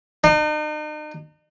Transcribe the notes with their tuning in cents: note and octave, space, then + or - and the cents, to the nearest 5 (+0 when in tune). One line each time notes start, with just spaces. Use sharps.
D#4 -40